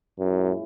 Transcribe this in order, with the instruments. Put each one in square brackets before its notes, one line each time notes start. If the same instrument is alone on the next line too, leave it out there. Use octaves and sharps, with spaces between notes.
[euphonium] F#2 [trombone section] A#2 G#3 C#4 E4